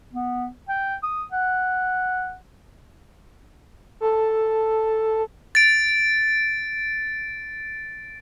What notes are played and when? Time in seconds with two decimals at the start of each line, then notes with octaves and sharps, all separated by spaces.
0.13 B3
0.69 G5
1.03 D#6
1.32 F#5
4.00 A4
5.55 A6 D7